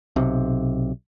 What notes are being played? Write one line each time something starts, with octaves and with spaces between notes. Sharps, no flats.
B1 C3